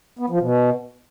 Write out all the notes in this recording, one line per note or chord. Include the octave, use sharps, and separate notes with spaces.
B3
F3
B2